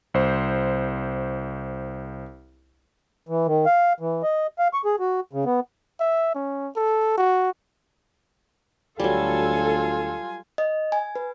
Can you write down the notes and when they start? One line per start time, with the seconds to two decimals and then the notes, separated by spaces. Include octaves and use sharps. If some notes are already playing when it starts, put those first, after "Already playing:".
0.14 C2 C5
3.29 E3
3.47 D#3
3.66 F5
4.00 E3
4.23 D#5
4.59 F5
4.74 C#6
4.85 G#4
4.99 F#4
5.33 C#3
5.45 B3
6.00 E5
6.35 C#4
6.76 A4
7.17 F#4
9.00 D2 F#3 G3 F4 A4 G#5
10.58 D#5
10.92 G#5
11.16 B4